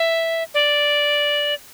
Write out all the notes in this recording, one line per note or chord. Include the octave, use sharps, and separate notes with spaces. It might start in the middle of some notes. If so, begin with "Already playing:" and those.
Already playing: E5
D5